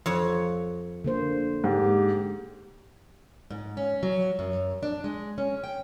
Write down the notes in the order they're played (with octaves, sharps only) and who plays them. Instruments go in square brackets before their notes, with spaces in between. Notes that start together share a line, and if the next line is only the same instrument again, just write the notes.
[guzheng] F2 C#5 F#5
[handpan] D3 A#3 C5
[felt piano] G#2 [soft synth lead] G4
[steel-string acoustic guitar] G#2
C#4
F#3
F#2
D4
G#3
C#4
G5